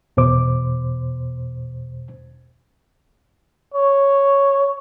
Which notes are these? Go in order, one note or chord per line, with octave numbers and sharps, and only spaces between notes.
E2 B2 C5 D6
C#5